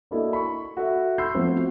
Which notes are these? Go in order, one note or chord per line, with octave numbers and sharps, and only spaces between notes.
A#3 D4 E4 F#4 A4 D#5
B5 C#6
F#4 A4 E5
B5 C6 E6 G6 C7
F3 A3 B3 C4
F#4